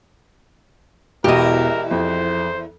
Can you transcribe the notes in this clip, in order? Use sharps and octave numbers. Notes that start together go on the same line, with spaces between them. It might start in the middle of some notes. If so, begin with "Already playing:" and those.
E1 E2 B2 E4 G4 A#4 D#5
F2 C5